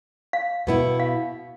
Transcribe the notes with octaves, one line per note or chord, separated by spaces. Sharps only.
F5
B2 B3 E4
F5